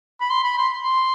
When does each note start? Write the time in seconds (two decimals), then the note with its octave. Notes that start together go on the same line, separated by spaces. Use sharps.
0.21 B5
0.30 C6
0.44 B5
0.58 C6
0.85 C6